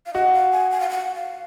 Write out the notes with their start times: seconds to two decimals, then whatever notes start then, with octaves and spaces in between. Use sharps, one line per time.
0.06 F5
0.14 F#4 D#5
0.33 F5
0.52 G#5
0.71 G#5
0.80 F5
0.90 F#5
1.15 F5